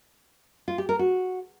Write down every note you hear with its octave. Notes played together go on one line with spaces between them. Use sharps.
F4
G4
A#4
F#4